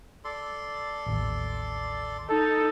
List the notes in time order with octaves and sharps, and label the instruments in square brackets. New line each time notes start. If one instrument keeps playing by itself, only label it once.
[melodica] A4 D5 C6
[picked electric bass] A1 D#2
[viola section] D#4 [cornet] A4